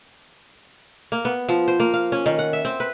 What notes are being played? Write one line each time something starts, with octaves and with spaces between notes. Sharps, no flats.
A#3
B3
F3
C5
A#3
F5
C#4
D#3
F#5
E5
C4
B4